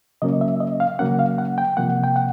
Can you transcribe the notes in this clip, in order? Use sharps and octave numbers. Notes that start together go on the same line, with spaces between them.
C#3 F#3 A#3 C#4 D#5
E5
D#5
F5
C#3 F#3 A#3 C#4 F#5
F5
F#5
G5
C3 F3 A#3 F#5
G5
F#5